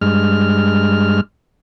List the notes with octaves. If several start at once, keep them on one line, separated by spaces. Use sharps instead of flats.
G2 G#3 F6